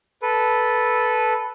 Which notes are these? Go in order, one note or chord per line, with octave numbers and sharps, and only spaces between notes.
A4 B4